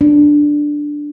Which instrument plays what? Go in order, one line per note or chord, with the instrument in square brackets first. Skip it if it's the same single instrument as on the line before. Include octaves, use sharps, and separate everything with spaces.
[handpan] D4